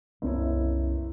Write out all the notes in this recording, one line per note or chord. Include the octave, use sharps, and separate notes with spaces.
F#1 C2 B3 C#4 E4